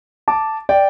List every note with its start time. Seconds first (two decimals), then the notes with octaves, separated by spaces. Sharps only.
0.28 A5 D6
0.69 D5 G5